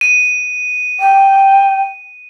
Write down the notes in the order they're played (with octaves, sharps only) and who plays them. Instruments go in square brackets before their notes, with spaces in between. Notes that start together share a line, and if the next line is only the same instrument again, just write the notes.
[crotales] D#7
[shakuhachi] G5